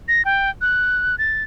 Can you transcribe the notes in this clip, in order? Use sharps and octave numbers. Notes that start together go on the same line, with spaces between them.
A#6
G5
F#6
A6